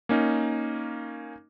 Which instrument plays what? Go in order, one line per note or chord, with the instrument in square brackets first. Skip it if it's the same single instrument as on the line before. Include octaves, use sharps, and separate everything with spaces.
[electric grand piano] A#3 C#4 D#4